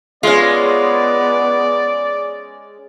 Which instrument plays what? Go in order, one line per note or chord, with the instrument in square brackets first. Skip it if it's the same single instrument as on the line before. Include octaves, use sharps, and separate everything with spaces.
[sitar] G#3 C#4 [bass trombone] B3 [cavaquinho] F4 F5 [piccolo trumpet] D5